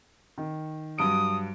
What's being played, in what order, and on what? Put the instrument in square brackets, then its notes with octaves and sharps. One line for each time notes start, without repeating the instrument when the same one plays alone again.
[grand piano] D#3
[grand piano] G2 F#3 D7 [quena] D#6